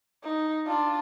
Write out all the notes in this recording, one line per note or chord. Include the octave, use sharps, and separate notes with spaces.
D#4
D4 F4